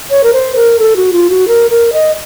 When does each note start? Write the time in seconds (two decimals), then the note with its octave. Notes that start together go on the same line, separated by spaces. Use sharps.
0.11 C#5
0.24 A#4
0.33 C5
0.56 A#4
0.79 A4
0.96 F#4
1.13 F4
1.30 F#4
1.48 A#4
1.71 A#4
1.93 D#5